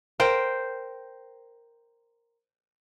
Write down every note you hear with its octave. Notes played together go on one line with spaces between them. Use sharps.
A#4 C5 G5